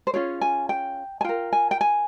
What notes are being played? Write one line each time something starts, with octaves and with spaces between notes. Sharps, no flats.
C5
C#4 F4 G#4 C#5
G#5
G5
G#5
F4 A#4 G5
G#5
G5
G#5